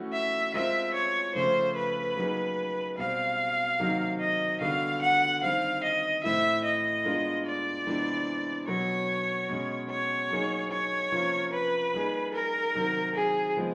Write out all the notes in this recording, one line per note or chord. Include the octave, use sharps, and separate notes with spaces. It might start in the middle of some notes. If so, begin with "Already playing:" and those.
Already playing: E3 A3 C#4 F#4 A4
E5
G#3 C4 F4 A#4 E5
C#5
C#3 F3 A3 C#4 C5
B4
F#3 A#3 D#4 G#4
B2 G3 C4 F5
C3 D#3 F#3 A#3 D#4
D#5
D3 G3 B3 D4 F#4 F5
F#5
D#3 G3 C4 F5
D#5
A2 E3 A3 C4 E4 E5
D#5
G#3 B3 D4 F4 A#4
D5
C3 E3 G#3 B3 D4
B2 F#3 B3 C#5
B2 G#3 C#4
C#5
F#3 A#3 D#4 G#4
C#5
C3 F3 A#3 C#4 F4
B4
G3 A#3 D#4 G#4
A#4
C3 D#3 F#3
G#4
F3 G#3 B3